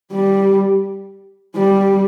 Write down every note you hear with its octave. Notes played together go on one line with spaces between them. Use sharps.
G3
G3